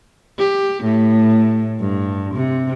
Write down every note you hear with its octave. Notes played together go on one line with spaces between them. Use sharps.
G4
A2
G2
C3